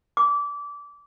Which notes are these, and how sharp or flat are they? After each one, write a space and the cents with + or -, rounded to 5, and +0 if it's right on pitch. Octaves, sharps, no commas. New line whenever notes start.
D6 -25